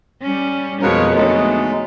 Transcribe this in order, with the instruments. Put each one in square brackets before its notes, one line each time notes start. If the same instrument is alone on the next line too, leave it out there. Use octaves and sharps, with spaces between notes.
[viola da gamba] G3 C#4
[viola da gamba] F2 C#5 [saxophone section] B2 G#3 [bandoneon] F3 A#4
[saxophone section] D3 F#3 B3 [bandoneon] G#3 D#4 [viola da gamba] A3